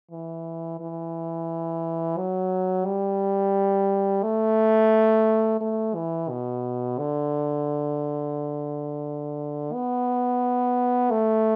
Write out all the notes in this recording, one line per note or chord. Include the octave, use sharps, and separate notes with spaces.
E3
E3
F#3
G3
A3
A3
E3
B2
D3
B3
A3